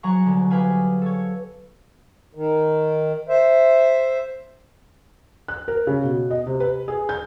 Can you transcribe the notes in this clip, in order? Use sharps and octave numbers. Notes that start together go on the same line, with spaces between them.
F#3 G#4 F#5 A#5 C#6
C2 D3
G4 G#4 B4 F5 G#5
A4 C#5
D#3
C5 E5
F#6
A#4
C#3
B2
D#5
C3
B4
G#4
G6